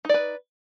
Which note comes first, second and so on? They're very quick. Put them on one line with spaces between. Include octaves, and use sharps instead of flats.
D#4 D5 B4